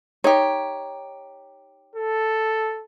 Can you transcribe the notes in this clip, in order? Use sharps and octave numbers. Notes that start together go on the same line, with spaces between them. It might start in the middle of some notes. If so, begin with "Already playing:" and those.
D#4 G4 C#5
A4